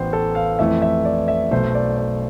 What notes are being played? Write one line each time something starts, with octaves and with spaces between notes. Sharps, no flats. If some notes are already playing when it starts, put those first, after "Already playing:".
Already playing: A1 A2 E3 B3 C5 G5
A4
F5
F2 E3 A3 C4 E5
E5
D5
E5
B1 B2 A3 C5
D5
D5